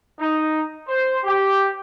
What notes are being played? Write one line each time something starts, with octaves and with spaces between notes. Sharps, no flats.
D#4
C5
G4